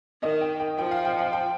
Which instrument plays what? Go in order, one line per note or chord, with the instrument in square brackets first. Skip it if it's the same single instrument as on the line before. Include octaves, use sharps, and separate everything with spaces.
[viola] D#3 [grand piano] D#5
[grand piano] G5
G5
[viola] F3 [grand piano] G5
[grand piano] F5
G5
F5
G5